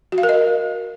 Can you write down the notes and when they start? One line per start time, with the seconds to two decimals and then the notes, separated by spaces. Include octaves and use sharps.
0.12 F#4
0.18 F5
0.23 A#4
0.29 D#5